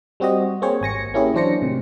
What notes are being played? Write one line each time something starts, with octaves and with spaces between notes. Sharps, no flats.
G3 C4 F#4 G4 D#5
A#3 C4 G#4 C5 C#5
G#1 G#5 A#6 C#7
A#3 C#4 E4 G4 G#4 C#5
E3 F#3 D4 C5 A#6 C#7
A2 C3 D#3